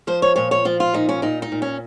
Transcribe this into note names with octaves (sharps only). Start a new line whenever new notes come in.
F3 C5
C#5
A#2 C#5
C#5
F3 F4
F4
A#2 D#4
C#4
A#2 D#4
D#4
A#2
C#4